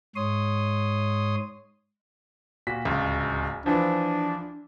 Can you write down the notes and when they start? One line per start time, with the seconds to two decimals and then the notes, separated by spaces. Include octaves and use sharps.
0.16 G#2 C#5 C6 D#6
2.67 A#2 F#4 B6
2.85 D1 C#2
3.66 E3 F3 D4